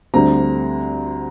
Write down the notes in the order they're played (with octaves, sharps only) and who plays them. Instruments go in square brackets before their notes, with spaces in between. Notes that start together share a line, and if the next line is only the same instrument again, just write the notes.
[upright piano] D2 D3 G3 C4 A#5